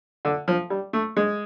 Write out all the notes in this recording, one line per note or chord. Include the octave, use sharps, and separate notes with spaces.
D3
F3
G3
A3
G#3